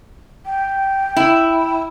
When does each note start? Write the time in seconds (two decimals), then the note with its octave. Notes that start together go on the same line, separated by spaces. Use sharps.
0.45 G5
1.17 E4